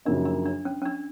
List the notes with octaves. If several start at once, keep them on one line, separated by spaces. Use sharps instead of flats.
F#2 C#3 F3 A#3 D4 D#4
D4
D4
C#4
C#4
D4